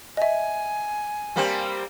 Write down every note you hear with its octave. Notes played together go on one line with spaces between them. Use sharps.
D#5 E5 G#5
G3 A#3 C4